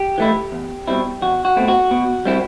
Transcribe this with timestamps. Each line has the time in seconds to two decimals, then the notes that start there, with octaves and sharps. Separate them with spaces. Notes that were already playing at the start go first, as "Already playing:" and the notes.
Already playing: G4
0.18 E3 A3 E4
0.52 E2
0.88 B2 G3 C4 E4
1.22 E2 F#4
1.45 F#4
1.56 B2 A3 C4
1.68 F#4
1.91 B2
2.26 G3 C4 E4